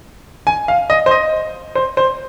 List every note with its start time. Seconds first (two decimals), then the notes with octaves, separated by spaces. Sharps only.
0.47 G#5
0.68 F5
0.90 D#5
1.06 C5
1.11 D#5
1.75 C5
1.97 C5